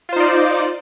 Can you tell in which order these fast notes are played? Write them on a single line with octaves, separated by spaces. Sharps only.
F4 C5 D#4 D5